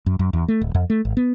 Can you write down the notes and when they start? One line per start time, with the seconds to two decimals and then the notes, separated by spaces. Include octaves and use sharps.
0.06 F#2
0.19 F#2
0.33 E2
0.48 A3
0.61 D1
0.74 F2
0.90 A3
1.05 G#1
1.17 B3